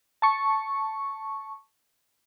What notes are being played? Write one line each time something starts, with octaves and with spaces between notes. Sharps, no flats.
A5 C#6